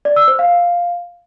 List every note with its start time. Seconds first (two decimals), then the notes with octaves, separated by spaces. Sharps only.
0.05 D5
0.16 E6
0.28 C5
0.39 F5